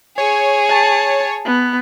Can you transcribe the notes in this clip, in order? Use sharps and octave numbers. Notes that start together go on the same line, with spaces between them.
G#4 C#5
A5
B3